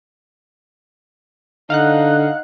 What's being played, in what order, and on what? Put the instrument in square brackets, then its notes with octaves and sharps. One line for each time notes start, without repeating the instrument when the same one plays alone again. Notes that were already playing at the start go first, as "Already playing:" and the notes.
[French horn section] D3 [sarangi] D#4 [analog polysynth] F5 F#5 F#6